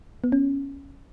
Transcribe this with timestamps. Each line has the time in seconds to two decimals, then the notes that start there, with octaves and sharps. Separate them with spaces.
0.24 B3
0.32 C#4